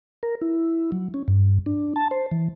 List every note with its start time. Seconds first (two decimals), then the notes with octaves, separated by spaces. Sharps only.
0.23 A#4
0.41 E4
0.92 F#3
1.14 C#4
1.28 G2
1.66 D4
1.96 A5
2.11 C5
2.31 E3